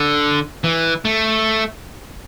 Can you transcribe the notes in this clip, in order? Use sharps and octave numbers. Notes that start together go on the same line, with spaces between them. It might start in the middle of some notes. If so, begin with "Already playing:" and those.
Already playing: D3
E3
A3